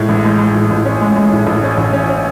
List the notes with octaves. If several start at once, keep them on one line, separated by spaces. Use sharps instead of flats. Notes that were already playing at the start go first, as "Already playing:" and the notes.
Already playing: A2 G#3
A1
G#3
G#3
A2
A1
C#4
G#3
G#3
A2
A1
C#4
A1
C#4
C#4